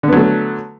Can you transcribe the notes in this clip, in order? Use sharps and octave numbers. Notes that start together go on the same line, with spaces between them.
D3 F#3 A3 B3